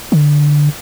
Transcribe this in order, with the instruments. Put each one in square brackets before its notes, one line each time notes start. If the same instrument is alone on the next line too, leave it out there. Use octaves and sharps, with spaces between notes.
[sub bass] D3